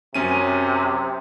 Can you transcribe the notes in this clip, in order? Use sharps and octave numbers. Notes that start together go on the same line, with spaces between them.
F#2 C3 C#4 D#7